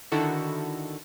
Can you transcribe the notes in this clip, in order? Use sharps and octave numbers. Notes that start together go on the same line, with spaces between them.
D3 D#3 E4 F#4 A4